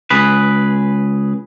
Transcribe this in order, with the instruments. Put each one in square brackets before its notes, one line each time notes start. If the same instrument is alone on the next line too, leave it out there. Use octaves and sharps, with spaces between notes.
[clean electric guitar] C#2 G#4 B4